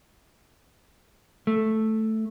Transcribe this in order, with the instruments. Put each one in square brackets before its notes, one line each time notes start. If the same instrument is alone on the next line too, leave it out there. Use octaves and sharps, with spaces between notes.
[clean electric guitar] A3